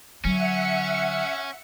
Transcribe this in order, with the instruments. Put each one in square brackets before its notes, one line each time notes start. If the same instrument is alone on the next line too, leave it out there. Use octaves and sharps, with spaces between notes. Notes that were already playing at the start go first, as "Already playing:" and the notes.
[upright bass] D3 F#3 [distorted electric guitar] C#4 [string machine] E5 F#5 C#7